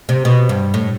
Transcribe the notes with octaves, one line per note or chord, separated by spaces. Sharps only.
C3
B2
G2
A2